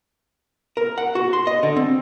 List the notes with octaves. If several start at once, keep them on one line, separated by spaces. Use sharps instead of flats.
A#4
F#5
F#4
C6
D#5
D3
C4